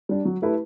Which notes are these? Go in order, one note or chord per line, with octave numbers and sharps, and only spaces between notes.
G3 D4
F#3
A3 E4 G4 B4